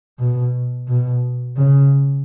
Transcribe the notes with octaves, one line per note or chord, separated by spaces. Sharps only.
B2
B2
C#3